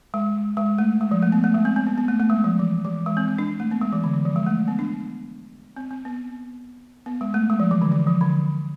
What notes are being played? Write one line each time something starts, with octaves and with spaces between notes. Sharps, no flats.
G#3
G#3
A3
G#3
F3
A3
B3
A3
G#3
C4
C4
B3
B3
A3
A3
G#3
F3
E3
E3
G#3
C4
C4
D4
A3
B3
G#3
E3
D3
E3
F3
G#3
A3
B3
D4
C4
C4
B3
B3
G#3
A3
G#3
F3
E3
D3
E3
F3
D3